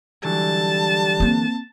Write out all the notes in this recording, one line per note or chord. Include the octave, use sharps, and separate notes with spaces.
D3 E3 F#3 G3 A5
A#3 C4